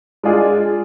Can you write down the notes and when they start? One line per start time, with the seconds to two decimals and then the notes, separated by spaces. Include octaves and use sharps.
0.23 G#3 D4 F4 G#4 D5